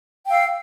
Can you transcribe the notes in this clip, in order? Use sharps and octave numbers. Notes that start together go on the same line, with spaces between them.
F5 G5 E6